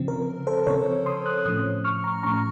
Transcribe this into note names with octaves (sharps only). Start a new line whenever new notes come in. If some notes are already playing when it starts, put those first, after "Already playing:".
Already playing: C#3 F3 C4
A#4
A4 C5
C#3 F3 C4 A#4 C#5
C6 D#6
D#6 F#6
A2 F3 A3 C#4 D#6 F#6
C#6 F6
A#5 C#6
A2 F3 A3 C#4 A#5 C#6